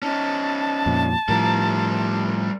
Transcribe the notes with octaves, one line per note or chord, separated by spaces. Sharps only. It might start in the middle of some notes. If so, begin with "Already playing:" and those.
C#4 D#4 A5
F2 A#2
A2 F3 G3 A#4